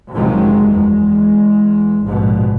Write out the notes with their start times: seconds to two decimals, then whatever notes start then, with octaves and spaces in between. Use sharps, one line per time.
0.13 F#1 C3 D#3 F3 F#3 G#3
0.72 E2 G#3
2.04 A#1 G#2 B2